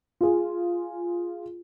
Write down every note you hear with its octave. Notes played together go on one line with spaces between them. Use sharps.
F4 G#4